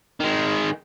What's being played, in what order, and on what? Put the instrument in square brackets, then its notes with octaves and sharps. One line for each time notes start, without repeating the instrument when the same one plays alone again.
[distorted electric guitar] D#3 G#3